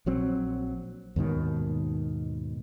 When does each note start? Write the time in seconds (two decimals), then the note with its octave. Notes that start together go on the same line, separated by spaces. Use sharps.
0.06 A#1 F#3 C4
1.16 D#2 G#2 B2 D#3